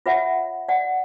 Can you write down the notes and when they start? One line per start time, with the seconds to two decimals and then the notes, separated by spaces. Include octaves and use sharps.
0.06 F4 B4 C#5 E5 F#5
0.69 D5 F#5